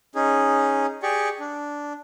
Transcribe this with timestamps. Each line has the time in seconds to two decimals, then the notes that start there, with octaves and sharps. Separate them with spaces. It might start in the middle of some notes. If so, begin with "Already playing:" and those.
0.15 C#4 D#4 G#4
1.03 G4 G#4 D5 C#6
1.40 D4